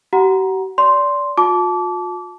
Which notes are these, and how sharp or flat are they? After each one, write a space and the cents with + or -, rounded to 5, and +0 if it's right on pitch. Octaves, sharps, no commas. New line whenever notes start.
G4 -45 F#5 +0 A#5 +15
D5 -25 C6 +0
F4 +45 A5 -20 D6 -25